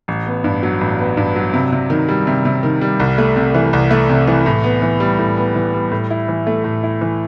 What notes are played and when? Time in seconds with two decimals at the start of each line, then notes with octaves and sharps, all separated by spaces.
0.08 A1
0.27 B3
0.44 G2
0.63 F#3
0.81 A1
0.99 B3
1.17 G2
1.35 F#3
1.54 C3
1.72 C3
1.90 D#3
2.09 G3
2.27 C3
2.45 C3
2.63 D#3
2.81 G3
3.00 C2
3.18 A3
3.36 C3
3.55 E3
3.73 C2
3.91 A3
4.09 C3
4.28 E3
4.46 A2
4.64 B3
4.82 E3
5.00 G3
5.19 A2
5.37 B3
5.55 E3
5.73 G3
5.91 A2
6.11 E4
6.28 E3
6.47 A3
6.64 A2
6.83 E4
7.01 E3